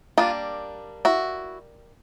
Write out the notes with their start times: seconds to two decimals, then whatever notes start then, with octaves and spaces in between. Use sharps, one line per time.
0.18 G3 A#3 D4 D#4 F4
1.05 E4 F#4